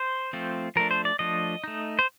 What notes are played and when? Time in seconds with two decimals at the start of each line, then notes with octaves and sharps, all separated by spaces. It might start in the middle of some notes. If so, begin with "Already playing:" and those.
Already playing: C5
0.33 F3 A3 C4 F4
0.76 F3 A3 D4 A#4
0.91 C5
1.05 D5
1.19 F3 A3 D4 D#5
1.64 A3 D#4
1.99 C5